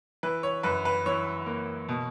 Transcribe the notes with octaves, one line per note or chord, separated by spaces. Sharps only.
E3 B4
C#5
F#2 B4
B4
E3 C#5
A#3
B2